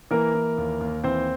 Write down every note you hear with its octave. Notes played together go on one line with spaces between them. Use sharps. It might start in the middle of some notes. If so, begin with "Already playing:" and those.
E3 A#3 A#4
E3
D#2
D#2
E3 C4 C5